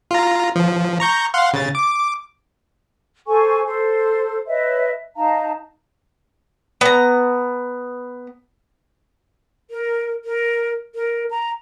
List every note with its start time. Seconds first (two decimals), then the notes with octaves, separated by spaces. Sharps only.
0.11 F4 A#5
0.56 F3
1.00 A#5 C#6 G6
1.34 F5 F#5 C6
1.53 C#3 A6
1.75 D6
3.27 A4 C5 G#5 C#6
3.66 A4 C5
4.47 B4 C#5 D#5 E5
5.16 D#4 F5 A5 A#5
6.81 B3 A#5
9.71 A#4
10.25 A#4
10.95 A#4
11.31 A#5